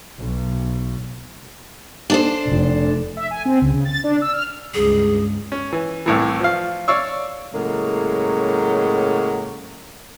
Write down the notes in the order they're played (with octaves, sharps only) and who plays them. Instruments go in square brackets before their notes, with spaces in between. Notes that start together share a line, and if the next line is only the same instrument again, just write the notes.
[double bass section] B1
[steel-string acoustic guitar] D4 A4 C5
[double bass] F1
[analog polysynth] E5
G#5
C4
C#2
C#3
A6
D4
E6
F6
[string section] C#2 G2 [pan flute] G#4
[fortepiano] C#4
E3
C2 A2 E3
F3 F5
C#5 D5 F5 C#6 E6
[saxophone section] A2 C#3 F#3 G#3 A#3